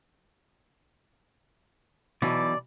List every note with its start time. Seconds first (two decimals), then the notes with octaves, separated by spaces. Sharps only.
2.22 B1 B2 E3 D5